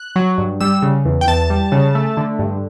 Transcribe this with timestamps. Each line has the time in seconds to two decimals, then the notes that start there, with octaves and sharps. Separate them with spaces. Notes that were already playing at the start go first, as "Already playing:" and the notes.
Already playing: F#6
0.16 F#3
0.38 G2
0.61 G3 E6
0.82 C#3
1.05 E2
1.21 G5
1.28 E2 A5
1.50 G3
1.72 C#3
1.95 A3
2.17 D3
2.39 G2